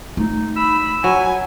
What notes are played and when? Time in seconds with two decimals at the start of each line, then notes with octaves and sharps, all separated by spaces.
0.17 A3 D#4
0.57 B5 E6
1.04 F#3 G#5